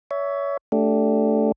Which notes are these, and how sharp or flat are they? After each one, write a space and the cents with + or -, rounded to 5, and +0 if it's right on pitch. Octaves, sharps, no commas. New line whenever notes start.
C#5 +25 E5 +0
A3 +0 D4 -20 G4 -15